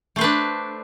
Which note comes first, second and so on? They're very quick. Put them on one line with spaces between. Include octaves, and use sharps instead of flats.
A3 C5 B4 D4